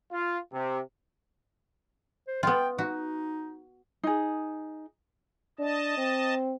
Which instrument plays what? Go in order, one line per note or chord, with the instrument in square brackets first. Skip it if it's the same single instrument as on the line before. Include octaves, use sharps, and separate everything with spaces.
[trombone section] F4
C3
[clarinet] C5
[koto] B3 F4 [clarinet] G5
[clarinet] D#4 [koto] F#4
[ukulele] D#4 G#4
[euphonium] D4 [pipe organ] D#5 A5
[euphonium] C4